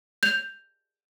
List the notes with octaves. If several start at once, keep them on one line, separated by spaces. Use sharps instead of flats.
G6 F7